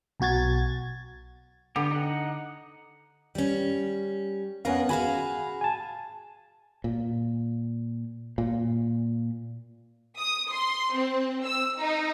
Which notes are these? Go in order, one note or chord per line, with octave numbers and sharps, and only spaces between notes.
B1 B2 F#4 G#6 A6
D3 B3 G4
D#4 F#5
G3 C#4
F2 B3 C#4 A#4 B4 F5
F#4 G#4 F5 G#5 B5
G#5 A5
A#2
A#2
D#6
C6
C4
E6
D#4